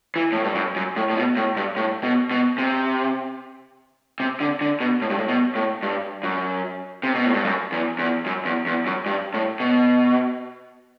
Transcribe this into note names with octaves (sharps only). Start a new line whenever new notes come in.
E3
A2
G2
F#2
F#2
A2
A2
B2
A2
G2
A2
B2
B2
C3
C3
D3
D3
B2
A2
G2
A2
B2
A2
G2
F#2
C3
B2
A2
G2
F#2
E2
E2
F#2
E2
E2
F#2
G2
A2
B2